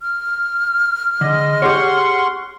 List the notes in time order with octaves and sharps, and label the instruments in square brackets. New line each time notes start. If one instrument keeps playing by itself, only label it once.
[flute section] F6
[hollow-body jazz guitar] D3 [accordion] G#3 D#5
[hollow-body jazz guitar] G4 G#4 C#5 [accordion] F#5 C6 C#6